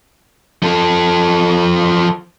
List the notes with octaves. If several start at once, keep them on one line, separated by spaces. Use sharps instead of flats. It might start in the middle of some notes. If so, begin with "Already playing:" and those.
F3 A4